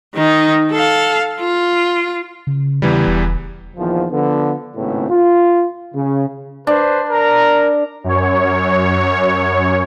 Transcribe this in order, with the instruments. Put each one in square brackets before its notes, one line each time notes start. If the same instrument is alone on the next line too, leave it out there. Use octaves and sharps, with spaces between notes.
[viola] D#3 D#4
A4 F5
F4
[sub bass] C#3
[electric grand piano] E2 E3 G3 [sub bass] C#3
[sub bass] E1
[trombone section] E2 A#2 D#3 F3
D3 F3 B3
G#1 A2 C#3 A3 B3 C4
F4
C#3
[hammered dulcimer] D4 [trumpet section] B4 C5
[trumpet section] A#4 A#5
[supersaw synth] F#2 C#5